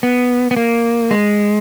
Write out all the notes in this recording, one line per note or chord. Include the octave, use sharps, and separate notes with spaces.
B3
B3
A#3
G#3